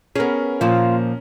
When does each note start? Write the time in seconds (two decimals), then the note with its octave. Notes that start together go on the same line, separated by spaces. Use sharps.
0.16 B3 C#4 G#4 A#4
0.61 A#2 F3 F4